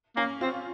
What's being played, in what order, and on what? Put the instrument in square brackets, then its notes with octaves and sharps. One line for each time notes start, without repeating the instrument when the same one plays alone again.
[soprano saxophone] A#3 [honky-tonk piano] C#4
[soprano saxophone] C4 [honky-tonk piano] F4